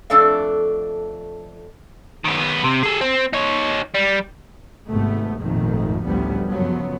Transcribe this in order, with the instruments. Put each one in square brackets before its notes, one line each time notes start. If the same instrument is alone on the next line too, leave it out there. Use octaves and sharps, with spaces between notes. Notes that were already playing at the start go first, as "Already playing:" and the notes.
[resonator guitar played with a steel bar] F2 A3 D4 A4 D5 F5
[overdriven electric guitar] D#3 B3
C3
G#4 A4
C4
D#4 C#5
G3
[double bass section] G#1 G#2 C3 A3 B3
G#1 F2 A#2 D#3 A3
A1 D2 F3 G3 B3
F#2 C#3 F3 F#3 B3